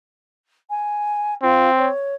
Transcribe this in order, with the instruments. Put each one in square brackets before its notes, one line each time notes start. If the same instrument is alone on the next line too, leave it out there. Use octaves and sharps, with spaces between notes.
[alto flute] G#5
[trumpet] C4 [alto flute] F4
[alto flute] C#5